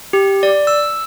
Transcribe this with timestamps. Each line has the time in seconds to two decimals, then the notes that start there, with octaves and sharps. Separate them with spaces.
0.13 G4
0.43 D5
0.67 E6